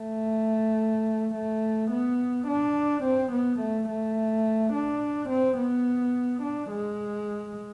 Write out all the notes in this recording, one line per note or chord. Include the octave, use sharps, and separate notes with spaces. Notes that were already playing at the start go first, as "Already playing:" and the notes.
Already playing: A3
A3
B3
D4
C4
B3
A3
A3
D4
C4
B3
D4
G#3